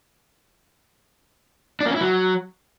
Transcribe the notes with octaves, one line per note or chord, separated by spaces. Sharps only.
D4
A#3
C#4
E4
F#3